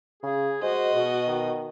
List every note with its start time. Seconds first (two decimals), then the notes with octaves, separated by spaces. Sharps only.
0.23 C#3 G#4
0.63 G#3 F#4 C5 D#5
0.94 B2
1.27 D#3